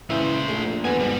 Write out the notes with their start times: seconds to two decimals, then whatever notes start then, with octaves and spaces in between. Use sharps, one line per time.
0.10 A#2 C#3 E3 G#3 C5 E5
0.48 A#1 A3 G#4 G#5
0.84 E2 G#2 B3 B4 G#5
1.00 G#1 G3